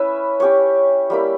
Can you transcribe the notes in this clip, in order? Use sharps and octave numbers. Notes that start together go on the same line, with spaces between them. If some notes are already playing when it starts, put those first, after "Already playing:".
Already playing: C#4 E4 B4 E5
C#4 G4 C#5
G3 A#3 E4